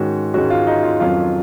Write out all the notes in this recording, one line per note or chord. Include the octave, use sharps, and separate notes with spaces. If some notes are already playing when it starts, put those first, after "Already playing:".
Already playing: G#2 D#3 G#3 C#4 F#4
G#2 D#3 G#3 C#4 F#4
F4
D#4
F4
F2 D#3 F#3 C#4 F4